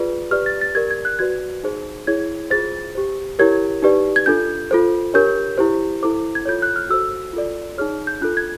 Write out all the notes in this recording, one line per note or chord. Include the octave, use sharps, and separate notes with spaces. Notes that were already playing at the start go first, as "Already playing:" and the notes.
Already playing: F4 G#4 B4 D5
G4 B4 D5 F6
A6
A6
G4 A#4 D5 G#6
G#6
F#6
F#4 B4 D5 G#6
D#4 G#4 C5
E4 G#4 C#5 G#6
F4 G#4 C5 A6
G4 C5
E4 G4 A#4 C#5 G#6
D#4 G4 B4 D5
G#6
D4 F4 A4 G6
F4 A4 C5
D4 G4 A#4 C#5 G6
E4 G4 C5
E4 A4 C5 D6
G#6
F4 A4 C#5 G6
F#6
F6
F#4 A4 C5 E6
F4 A4 D5
D#4 G#4 C#5 F6
G6
D4 F4 A4 F#6
G#6